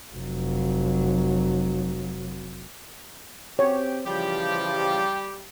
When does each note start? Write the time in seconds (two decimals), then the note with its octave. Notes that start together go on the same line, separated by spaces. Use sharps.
0.15 F1 F#3
3.59 C4 G4 C#5
4.06 C#3 E3 F3 G3 G4